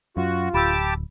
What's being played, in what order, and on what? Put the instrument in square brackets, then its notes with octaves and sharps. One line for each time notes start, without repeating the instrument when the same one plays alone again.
[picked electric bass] F#2 [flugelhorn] F4 [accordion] F#4
[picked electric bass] D1 [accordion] G4 A5 D6 [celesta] B5 E6